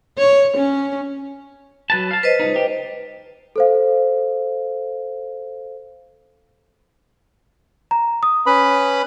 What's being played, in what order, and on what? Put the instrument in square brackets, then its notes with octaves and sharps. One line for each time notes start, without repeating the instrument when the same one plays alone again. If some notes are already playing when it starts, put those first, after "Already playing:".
[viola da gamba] C#5
C#4
[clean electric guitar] F#3 B4 A5
F5 A5
[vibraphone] B4 C5 D#5
[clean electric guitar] C#2 D#4
G4
[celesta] A4 C5 F5
A#5
D#6
[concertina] C#4 B4 B5